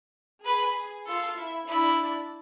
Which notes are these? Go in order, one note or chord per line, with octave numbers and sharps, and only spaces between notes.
G#4 B4 G#5
F4 A4 F5
E4 E5
D4 E4 D5